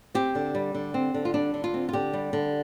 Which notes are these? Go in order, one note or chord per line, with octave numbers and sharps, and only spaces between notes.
C4 G4
D3
G3
D3
C4
D3
F4
G3 D4
D3
F4
C4
F4
D3 G4
G3
D3